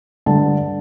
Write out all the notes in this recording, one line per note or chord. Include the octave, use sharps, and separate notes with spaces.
G2 D3 A5